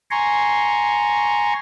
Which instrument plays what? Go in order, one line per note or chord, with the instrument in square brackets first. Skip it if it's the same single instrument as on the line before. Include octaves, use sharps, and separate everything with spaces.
[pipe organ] G#5 A#5 C6 C#6